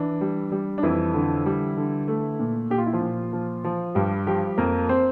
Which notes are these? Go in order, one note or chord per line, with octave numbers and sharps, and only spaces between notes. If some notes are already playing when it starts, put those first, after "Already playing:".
Already playing: E3 D4
G3
G3
D4
F2 E3 E4
D3
G3
D3
A3
A#2
A#2 G4
F4
E4
F3 F4
A#2
F3
F3
G2 G3 G4
F3 G3 G4
F2 A#3 A#4
C4 C5